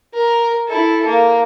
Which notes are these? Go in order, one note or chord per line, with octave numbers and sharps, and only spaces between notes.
A#4
E4 A4
A#3